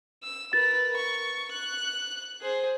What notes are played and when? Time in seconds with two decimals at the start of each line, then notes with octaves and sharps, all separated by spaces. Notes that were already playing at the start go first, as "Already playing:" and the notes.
0.23 E6
0.53 A#4 B4 A6
0.96 C#6
1.52 F#6
2.41 G#4 C5